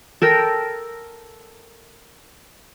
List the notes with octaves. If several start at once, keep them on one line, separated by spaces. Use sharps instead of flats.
A4 A#4 G5